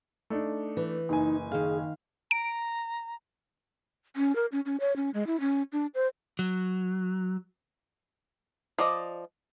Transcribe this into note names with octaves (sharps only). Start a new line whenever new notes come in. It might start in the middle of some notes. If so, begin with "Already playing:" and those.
A3 D4 D#4
E3
F#1 D#4 G#5
D#3 G#4 F5
A#5 D7
C#4
A#4
C#4
C#4
C#5
C#4
G#3
E4
C#4
D4
C5
F#3
F3 D5 D#5